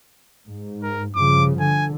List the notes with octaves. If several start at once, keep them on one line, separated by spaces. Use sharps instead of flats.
G#2
A#4
G2 C#3 F3 D6
D3 G#5